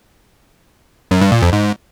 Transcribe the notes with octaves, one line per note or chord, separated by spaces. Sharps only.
F#2
G2
A#2
F2
G#2